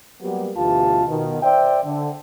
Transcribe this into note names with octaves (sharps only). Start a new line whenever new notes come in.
F#3 G3 A#3 B3 G4
D2 B2 E3 F4 G4 A5
B2 D#3
C5 D5 E5 G5
D3